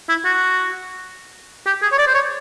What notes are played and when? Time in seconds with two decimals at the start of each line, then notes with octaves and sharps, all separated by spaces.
0.09 E4
0.25 F#4
1.66 G4
1.82 G#4
1.92 C#5
1.98 D5
2.07 C5
2.14 C#5